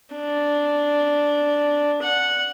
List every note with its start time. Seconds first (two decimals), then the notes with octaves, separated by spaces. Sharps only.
0.16 D4
2.03 F#5